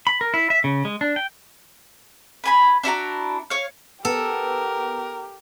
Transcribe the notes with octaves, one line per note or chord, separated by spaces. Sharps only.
B5
A#4
E4
E5
C#3
G#3
D4
G5
B4 G#5 B5
D4 E4 F#4 A#5
C#5 F5
B3 G4 A4 A#4